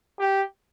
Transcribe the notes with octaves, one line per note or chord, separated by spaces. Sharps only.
G4